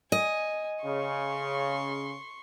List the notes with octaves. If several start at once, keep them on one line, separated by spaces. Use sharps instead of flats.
D#5 G#5
C#3 C6 C#6